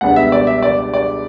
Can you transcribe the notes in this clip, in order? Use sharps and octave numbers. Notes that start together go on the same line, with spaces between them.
C#2 B2 G3 B3 D4 F#5
E5
D5
E5
D5
D5